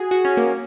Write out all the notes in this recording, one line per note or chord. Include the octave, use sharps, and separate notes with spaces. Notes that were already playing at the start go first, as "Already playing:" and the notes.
Already playing: F#4 G#4
F#4
C#4
A#3